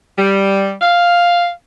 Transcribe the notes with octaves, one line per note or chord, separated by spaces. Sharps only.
G3
F5